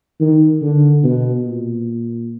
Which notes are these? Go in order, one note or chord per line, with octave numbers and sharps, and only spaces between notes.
D#3
D3
B2
A#2